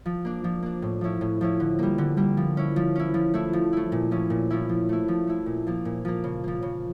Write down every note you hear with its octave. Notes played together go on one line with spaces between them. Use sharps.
F3
A#3 D4
F3
A#3 D4
A2
F3 C#4 E4
A2
F3 C#4 E4
D3
G3 A#3
D3
G3 A#3
F3
C#4 E4
F3
C#4 E4
F3
A3 E4
F3
A3 E4
A#2
F3 C#4 E4
A#2
F3 C#4 E4
F3
A3 E4
F3
A3 E4
A#2
F3 A#3
A#2
F3 A#3
C#3
F3 A#3
C#3